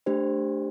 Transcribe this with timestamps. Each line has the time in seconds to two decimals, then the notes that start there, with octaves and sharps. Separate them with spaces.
0.06 A3 D4 G4 C5